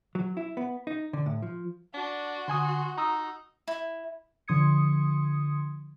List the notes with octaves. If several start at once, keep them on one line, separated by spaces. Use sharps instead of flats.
F#3
E4
B3
D#4
D3
A2
F3
D4 F#4
D3 G#5 C6 D#6
D#4 A#5 D#6 E6
E4
D3 F3 C6 D#6 G#6 C#7